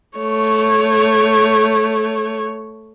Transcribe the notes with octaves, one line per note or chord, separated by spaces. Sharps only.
A3 C#5